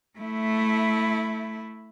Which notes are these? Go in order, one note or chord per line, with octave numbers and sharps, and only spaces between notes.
A3 E4